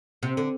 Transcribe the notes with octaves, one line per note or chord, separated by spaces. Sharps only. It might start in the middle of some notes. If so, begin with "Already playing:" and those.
C3
D3